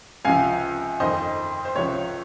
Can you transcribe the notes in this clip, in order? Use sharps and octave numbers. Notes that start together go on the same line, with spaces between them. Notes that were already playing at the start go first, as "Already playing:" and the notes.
C#2 C3 F3 F5 G#5
G1 F2 D#3 C5 D#5
C5
C#2 C3 F3 C#5